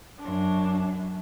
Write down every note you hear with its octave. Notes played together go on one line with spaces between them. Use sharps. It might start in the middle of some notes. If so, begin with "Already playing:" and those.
F#2 D4